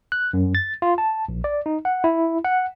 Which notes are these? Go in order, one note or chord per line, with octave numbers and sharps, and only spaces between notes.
F#6
F#2
A6
F4
A5
A#1
D5
D#4
F#5
E4
F#5